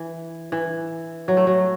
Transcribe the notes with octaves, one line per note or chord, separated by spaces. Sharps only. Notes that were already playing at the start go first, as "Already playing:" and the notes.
Already playing: E3
E3
F#3
A3
F#3